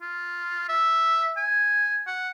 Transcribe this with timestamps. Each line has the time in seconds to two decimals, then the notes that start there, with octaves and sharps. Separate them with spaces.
0.02 F4
0.69 E5
1.37 G#5
2.07 F#5